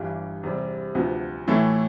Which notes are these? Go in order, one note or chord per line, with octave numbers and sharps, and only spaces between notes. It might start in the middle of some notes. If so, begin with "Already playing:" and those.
Already playing: G1 G2 E3 G3
E2 C3 G3 C4
D2 C3 F3 B3
A2 E3 A3 E4 A4